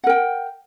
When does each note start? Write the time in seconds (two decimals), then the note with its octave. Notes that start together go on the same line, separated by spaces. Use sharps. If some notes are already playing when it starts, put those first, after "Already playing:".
0.04 F#5
0.07 A#4
0.09 G5